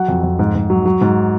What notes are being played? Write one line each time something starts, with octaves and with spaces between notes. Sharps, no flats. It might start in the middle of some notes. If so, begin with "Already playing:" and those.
Already playing: F#3 F#5
F2
F2
G#2
G#2
F#3
F#3
G#2